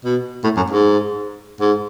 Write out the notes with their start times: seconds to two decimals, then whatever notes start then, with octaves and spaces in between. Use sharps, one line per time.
0.05 B2
0.44 A2
0.57 F#2
0.70 G#2
1.61 G#2